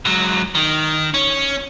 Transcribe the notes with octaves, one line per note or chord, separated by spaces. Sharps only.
G#2 F#3
D#3
C#4